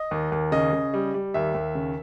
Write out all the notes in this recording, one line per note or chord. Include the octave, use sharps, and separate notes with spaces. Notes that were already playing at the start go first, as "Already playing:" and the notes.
Already playing: D#5
D#2
D#2
C#3 D#5
C#3
G3
G3
D#2 E5
D#2
C#3